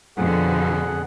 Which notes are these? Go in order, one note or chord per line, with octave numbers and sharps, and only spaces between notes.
F2 B2 D3 G#4 F#5